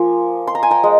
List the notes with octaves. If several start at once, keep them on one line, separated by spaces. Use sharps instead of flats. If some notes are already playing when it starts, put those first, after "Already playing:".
Already playing: F3 A#3 G#5 C6
C6
A#5
G#5
G5 A#5
G#3